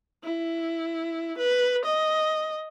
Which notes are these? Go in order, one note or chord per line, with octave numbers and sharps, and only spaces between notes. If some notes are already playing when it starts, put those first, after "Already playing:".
E4
B4
D#5